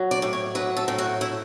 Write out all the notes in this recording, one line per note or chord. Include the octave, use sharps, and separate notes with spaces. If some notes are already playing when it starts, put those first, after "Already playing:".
Already playing: F#3
D5
A2
C#5
F#3 B4
A4
A2
F#4
E4